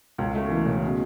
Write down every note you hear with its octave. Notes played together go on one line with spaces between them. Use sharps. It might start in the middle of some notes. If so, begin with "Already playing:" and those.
C#2
A3
E3
C#3
B2